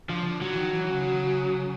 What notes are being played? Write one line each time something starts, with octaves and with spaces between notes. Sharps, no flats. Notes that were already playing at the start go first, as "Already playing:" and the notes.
D3 F3
C#3
D3
D3 F#3
E3
D#3
E3
C#3